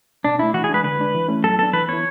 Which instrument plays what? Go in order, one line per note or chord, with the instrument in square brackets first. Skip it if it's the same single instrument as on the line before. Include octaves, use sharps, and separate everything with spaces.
[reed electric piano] B2 [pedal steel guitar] D4
[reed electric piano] A3 D4 [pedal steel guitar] E4
[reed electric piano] E3 [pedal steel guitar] F#4
[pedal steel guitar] G#4
[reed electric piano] G#3 D4 [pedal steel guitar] B4
[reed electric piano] D3 [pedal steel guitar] B4
[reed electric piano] G#3 D4
E3
A3 C#4 E4
[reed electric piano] F#3 [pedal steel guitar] A4
[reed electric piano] B3 D4 [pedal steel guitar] A4
[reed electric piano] E3 [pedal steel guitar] B4
[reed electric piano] B3 E4 [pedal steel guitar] C#5